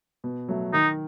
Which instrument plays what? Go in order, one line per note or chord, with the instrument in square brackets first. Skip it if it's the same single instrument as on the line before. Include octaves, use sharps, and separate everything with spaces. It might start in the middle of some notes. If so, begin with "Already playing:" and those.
[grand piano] B2
F#3 A3
[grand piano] D#3 [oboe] D#4